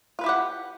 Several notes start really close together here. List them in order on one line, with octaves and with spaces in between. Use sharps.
F4 B4 E4 G4 F#5